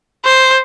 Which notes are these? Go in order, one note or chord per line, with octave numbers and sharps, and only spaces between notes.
C5